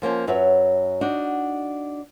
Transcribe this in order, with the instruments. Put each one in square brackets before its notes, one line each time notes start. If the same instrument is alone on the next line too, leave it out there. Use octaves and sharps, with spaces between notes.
[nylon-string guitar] F3 A#3 C#4 C5
F#2 F#3 B4 C#5 E5
D4 D#4 F#4